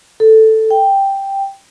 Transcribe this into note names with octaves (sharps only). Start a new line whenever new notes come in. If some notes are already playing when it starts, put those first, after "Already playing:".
A4
G5